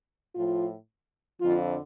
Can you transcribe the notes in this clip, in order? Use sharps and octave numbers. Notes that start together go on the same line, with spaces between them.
A2 F3 F4
F2 D3 F3 F4